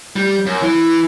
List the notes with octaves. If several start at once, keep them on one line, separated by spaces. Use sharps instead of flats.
G3
F#2
E3